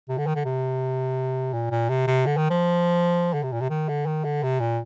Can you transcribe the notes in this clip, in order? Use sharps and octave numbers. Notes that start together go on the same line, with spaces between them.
C3
D3
D#3
D3
C3
A#2
A#2
C3
C3
D3
D#3
F3
D3
C3
A#2
C3
D#3
D3
D#3
D3
C3
A#2